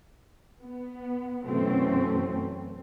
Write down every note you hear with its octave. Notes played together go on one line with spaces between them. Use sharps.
B3
F#2 B2 E3 A3 C4 C#4